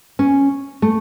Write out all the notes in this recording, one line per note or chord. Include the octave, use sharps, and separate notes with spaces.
C#4
A3